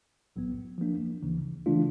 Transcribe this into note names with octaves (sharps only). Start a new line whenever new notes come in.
B1 A2 F#3 B3
F3 A#3 D4
D2 C#3 E3
C#3 E3 A3 D4 F4